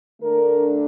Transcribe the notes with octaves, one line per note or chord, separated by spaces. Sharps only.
D3 A3 D4 A#4